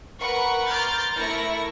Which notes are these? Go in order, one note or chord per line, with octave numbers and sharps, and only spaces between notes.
A#4 B4 F#5 B5 C#6
A#5 C6 D6 F6 G6 A6
A3 E4 A#4 C#6 A#6 C#7